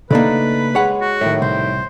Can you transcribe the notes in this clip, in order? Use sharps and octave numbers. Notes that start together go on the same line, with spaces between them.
C#3 A3 A#3 D4 D#4 B4
G#3 C#5 F#5
F#4
A2 D#3
C2 C5